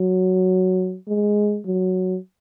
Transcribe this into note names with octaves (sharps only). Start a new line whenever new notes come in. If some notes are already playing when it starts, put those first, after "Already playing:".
Already playing: F#3
G#3
F#3